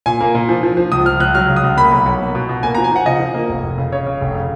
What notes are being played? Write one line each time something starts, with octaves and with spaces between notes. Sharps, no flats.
A#2 G#5
A#3
A#2
F3
F3
F3
C#2 D#6
C#2 F6
C#2 F#6
F#3 F6
C#3
D#6
C#2
A#3 B5
B1
B1
A#3
B2
B2
A#3 G#5
A#5
F3
G#5
F3 F#5
C#3 D#5
F3
A#3
F1
F1
C#3
C#3 C#5
C#3
F1
C#3